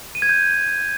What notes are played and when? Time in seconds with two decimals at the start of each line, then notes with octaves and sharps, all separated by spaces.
0.15 D#7
0.22 G#6
0.29 G6